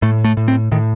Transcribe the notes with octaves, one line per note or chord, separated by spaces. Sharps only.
A2 A3
A3
A2
C4
A2 D#3